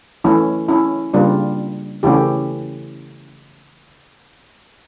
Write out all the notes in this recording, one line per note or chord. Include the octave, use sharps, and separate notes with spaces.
E3 A3 C#4 E4
C#4 E4
C#3 G3 A#3 D4 F4
C#3 E3 A3 C#4 E4 G4